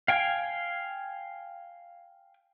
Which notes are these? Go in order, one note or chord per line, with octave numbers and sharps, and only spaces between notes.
F5 G5 G#5